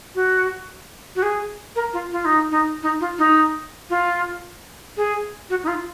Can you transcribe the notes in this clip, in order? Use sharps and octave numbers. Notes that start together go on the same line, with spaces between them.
F#4
F#4
G#4
A#4
F4
F4
D#4
D#4
D#4
F4
D#4
F4
G#4
F#4
D#4
F4